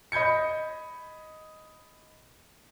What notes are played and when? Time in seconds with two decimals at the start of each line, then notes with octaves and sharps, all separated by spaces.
0.12 D#5 B5 G6 G#6 C#7